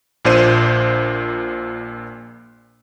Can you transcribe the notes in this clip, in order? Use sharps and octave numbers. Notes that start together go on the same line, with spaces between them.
A#1 A#2 D4 C5 D#7